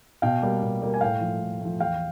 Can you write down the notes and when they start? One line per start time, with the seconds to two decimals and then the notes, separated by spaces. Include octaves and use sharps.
0.22 B2 F5 G5
0.42 G3 A#3
0.62 B2
0.82 G3 A#3
0.94 G#5
1.01 A2 F5 G5
1.21 F3 A3
1.40 A2
1.61 F3 A3
1.80 E2 F5 G5